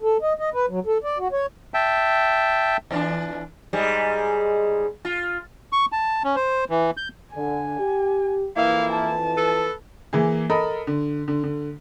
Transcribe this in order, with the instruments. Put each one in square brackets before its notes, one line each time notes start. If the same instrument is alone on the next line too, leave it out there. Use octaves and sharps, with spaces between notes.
[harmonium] A4
D#5
D#5
B4
F#3
A4
D5
F#4
C#5
[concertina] E5 G5 A5
[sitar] E2 E3 D4
G#2 G3 G#3
F4
[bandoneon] C#6
A5
C#4
C5
E3
G6
[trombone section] D3 [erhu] G#5
[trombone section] G4
[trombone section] F2 E3 [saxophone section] A#3 E4 [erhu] F5
[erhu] A5
[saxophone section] A4 B4
[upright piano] E3 A#3 G#4
A4 A#4 D#5 B5
D3
D3
D3